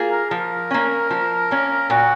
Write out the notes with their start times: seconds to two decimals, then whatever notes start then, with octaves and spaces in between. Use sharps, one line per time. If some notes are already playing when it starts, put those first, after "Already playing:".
Already playing: A#3 F4 G#4
0.11 A#4
0.30 F3 A#4
0.71 A#3 C#4
1.10 F3
1.51 A#3 C#4
1.90 A#2 F#4